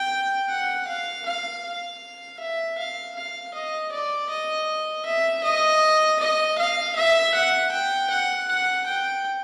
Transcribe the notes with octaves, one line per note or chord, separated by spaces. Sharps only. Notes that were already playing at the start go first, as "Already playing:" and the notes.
Already playing: G5
F#5
F5
F5
F5
E5
F5
F5
D#5
D5
D#5
E5
D#5
D#5
F5
E5
F#5
G5
F#5
F#5
G5